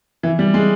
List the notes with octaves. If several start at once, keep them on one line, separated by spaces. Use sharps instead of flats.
E3
G3
G#3